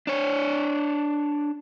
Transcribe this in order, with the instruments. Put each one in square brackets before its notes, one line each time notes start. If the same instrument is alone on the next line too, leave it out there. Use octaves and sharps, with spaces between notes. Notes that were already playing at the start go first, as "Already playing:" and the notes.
[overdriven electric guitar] D4 C#5